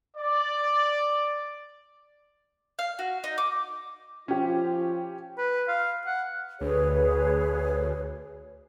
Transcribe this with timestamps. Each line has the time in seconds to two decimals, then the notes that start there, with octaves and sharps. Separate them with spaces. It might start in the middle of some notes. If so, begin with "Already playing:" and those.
0.16 D5
2.79 F5
2.99 F#4
3.24 D#4
3.38 D6
4.28 F3 C#4 F4 G4
5.38 B4
5.68 F5
6.06 F#5
6.61 D2 G#4 B4 C#5